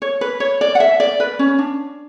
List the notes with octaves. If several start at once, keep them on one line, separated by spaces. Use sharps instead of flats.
C#5
B4
C#5
D5
F#5
E5
D5
B4
C#4
D4